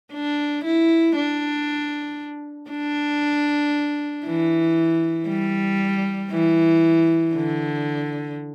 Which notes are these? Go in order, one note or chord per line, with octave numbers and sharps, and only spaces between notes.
D4
E4
D4
D4
E3
G3
E3
D3